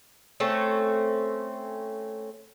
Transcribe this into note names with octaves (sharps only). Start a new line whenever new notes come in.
A3 C4 C#4